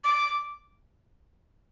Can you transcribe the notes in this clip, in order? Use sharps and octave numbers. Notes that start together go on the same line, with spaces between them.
D6